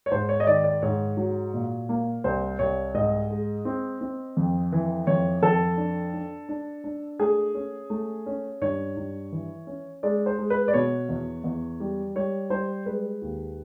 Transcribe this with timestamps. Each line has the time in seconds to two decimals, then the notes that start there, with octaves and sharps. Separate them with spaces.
0.06 C#5
0.11 G#2 C5
0.29 C#5
0.40 D#5
0.47 D#3 D5
0.64 D5
0.82 G#2 C#5
1.17 F#3
1.54 A#2
1.89 A#3
2.24 C2 C5
2.59 C2 C#5
2.94 G#2 D#5
3.30 G#3
3.65 C4
4.01 C4
4.37 F2
4.72 E3
5.07 F2 C#5
5.42 F2 A4
5.77 D4
6.13 D4
6.49 D4
6.84 D4
7.19 A3 G#4
7.55 C#4
7.90 A3
8.26 C#4
8.61 G2 C#5
8.97 G2
9.32 E3
9.67 C#4
10.03 G#3 D5
10.26 C5
10.38 G#3
10.50 B4
10.68 D5
10.74 B2 C#5
11.09 E2
11.44 E2
11.80 G3
12.15 G3 C#5
12.50 G3 C5
12.86 G#3 B4
13.22 D#2